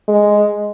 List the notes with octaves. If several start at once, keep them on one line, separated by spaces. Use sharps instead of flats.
G#3